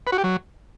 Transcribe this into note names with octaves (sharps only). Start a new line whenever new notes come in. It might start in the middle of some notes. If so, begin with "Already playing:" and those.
B4
F#4
G4
F#3